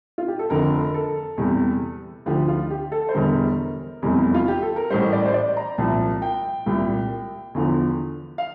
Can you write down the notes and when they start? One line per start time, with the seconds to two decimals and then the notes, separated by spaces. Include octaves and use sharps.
0.18 F4
0.28 G4
0.39 A4
0.50 F1 F2 D3 A#4
0.94 A4
1.38 E2 C3 G3
2.26 D2 D3 F3 G4
2.48 F4
2.70 G4
2.92 A4
3.09 C5
3.14 E1 E2 D3 G3 A#4
4.02 F1 E2 C3 G3
4.35 F4
4.48 G4
4.62 A4
4.76 A#4
4.90 A1 A2 G3 C5
5.13 D5
5.25 C5
5.34 D5
5.57 A#5
5.78 C2 A#2 F3 A5
6.22 G5
6.66 C2 A#2 G3
7.55 E2 D3 F3
8.38 F5